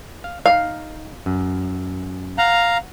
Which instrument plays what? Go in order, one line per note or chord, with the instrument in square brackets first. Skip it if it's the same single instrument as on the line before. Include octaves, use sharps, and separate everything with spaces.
[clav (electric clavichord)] F5
[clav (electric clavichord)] D#4 [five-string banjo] F5
[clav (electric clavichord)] F#2
[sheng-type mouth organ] F5 A#5 [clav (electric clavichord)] F#5